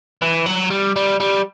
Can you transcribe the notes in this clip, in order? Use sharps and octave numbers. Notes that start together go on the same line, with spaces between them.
E3
F#3
G3
G3
G3